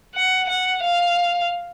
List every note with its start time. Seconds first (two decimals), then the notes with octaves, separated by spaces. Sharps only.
0.15 F#5
0.49 F#5
0.83 F5